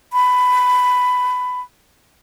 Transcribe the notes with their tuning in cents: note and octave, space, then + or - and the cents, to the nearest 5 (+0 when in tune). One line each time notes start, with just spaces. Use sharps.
B5 +15